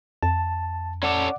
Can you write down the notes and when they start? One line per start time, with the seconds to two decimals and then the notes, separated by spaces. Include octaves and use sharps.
0.23 F2 A5
1.03 C#4 A4 C#5 D5 F#5 D6